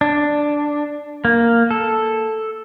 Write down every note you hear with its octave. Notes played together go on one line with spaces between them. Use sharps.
D4
A#3
A4